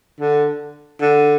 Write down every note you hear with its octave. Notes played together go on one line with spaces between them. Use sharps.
D3
D3